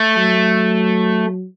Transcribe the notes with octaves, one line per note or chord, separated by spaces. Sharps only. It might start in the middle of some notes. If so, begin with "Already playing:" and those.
Already playing: A3
F#3